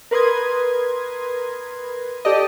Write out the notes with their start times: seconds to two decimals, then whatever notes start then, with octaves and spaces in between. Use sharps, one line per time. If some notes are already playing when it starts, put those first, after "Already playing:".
0.11 A#4 B4 C6 D#6 G#6
2.25 G4 A4 D5 D#5